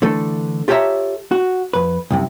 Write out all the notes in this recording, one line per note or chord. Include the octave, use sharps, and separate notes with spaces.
D3 E3 A3 A4
F4 G4 A4 C#5 E5 A#5
F#4
F2 B4
C2 F#2 C3